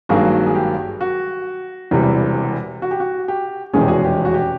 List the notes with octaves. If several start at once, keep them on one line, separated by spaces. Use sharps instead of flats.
G#1 G2 D#3 F#3 A#3 F#4 G#4
G#4
G4
F#4
E1 E2 C3 E3 G3
F#4
G4
F#4
G4
F1 E2 B2 G#3 C#4 G#4
G4
F#4 G#4
G4
F#4
G4